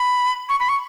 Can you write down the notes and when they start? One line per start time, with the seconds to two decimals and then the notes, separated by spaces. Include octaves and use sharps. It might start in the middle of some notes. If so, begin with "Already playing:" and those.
Already playing: B5
0.49 C#6
0.60 B5
0.69 C#6